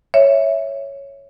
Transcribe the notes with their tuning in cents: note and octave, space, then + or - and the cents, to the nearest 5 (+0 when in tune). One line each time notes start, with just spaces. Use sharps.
C#5 +0 E5 +0